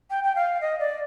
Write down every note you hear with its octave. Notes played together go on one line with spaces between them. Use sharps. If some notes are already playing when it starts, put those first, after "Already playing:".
G5
G5
F5
D#5
D5